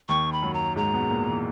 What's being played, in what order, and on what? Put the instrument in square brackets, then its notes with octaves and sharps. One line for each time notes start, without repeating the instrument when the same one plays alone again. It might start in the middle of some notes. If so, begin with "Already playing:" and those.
[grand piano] D#2 D#3 [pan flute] C#6
[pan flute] B5
[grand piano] F#2 F#3
[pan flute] A#5
[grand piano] G#2 G#3 [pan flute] A#5
[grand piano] B2 B3
A#2 A#3
E3